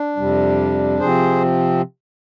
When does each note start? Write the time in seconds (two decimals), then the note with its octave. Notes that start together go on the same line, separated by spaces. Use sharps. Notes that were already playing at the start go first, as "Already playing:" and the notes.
Already playing: D4
0.16 F2 C3 G3
0.99 C3 F3 C4 G#4 C5